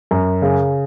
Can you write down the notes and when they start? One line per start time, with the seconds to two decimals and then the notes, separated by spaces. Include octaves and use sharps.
0.11 F#2
0.42 C#3